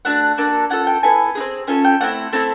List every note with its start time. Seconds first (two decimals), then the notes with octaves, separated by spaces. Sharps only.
0.05 A3 D4 F#4 F#5
0.37 A#3 D4 F#4 A4
0.70 C#4 F4 A4 F#5
0.87 G5
1.03 B3 E4 A4 G#5
1.35 D#4 G#4
1.40 C4
1.67 C#4 F4 A4 G#5
1.84 G5
2.01 A3 C4 E4 F#5
2.33 A3 C4 E4 A4